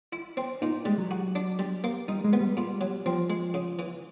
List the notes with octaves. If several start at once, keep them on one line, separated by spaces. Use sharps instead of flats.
E4
C4
A#2 D#4
G3 G#3
F#3
F#4
D4
G3
A#3
G3 D#4
G#3
B3
G3
A#2
F#3
F3 C4
G#3
C#3
E3